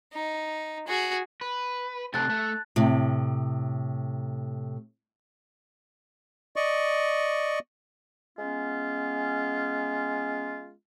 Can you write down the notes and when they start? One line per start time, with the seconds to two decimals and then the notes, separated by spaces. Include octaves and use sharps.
0.13 D#4
0.88 F#4 G#4
1.41 B4
2.14 C3 A3 C4 A5 F#6 A6
2.30 A3
2.76 A2 C3
6.56 D5 D#5 C#6
8.38 G#3 B3 C#4 F4